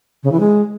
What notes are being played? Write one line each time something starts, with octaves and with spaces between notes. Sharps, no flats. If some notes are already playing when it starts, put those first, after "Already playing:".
C#3
E3
G#3